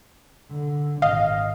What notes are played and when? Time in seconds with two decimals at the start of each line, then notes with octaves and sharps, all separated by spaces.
0.52 D3
1.02 G#1 A#2 D#5 F5